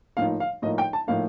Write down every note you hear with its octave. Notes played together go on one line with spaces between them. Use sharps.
A2 F3 A#3 D#4 F5
F5
A2 F3 A#3 D#4 D#5
G5
A5
A2 F3 A#3 D#4 F5